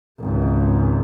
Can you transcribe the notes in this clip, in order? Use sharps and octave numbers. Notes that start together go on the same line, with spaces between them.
G#1 C#2